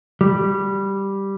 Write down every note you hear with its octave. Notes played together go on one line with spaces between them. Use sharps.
G3